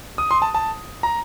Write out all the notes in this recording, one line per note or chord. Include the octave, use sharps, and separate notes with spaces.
D#6
C6
A5
A5
A#5